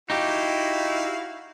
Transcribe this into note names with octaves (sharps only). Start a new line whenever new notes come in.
D#4 E4 F#4 G4 F5